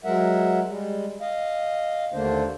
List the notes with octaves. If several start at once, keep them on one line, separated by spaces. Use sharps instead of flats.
F#3 G#3 A#4 E5 F#5
G3 G#3
D#5 F5
D#2 D3 A3 A#3 D4 C5